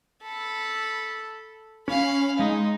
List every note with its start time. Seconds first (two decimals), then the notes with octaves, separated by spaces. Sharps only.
0.23 A4 B5
1.88 C#4 F5 B5
2.39 G#3 D#4